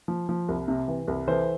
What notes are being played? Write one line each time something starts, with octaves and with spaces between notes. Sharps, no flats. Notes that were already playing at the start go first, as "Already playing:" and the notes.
F3
F3
C2
C3
E3
C2
E3 A4 C5